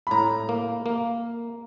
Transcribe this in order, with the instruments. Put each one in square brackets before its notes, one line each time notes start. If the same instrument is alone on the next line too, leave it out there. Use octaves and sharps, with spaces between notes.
[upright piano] B5
[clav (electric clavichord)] A2 [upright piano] A#5
[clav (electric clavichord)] A#3
A#3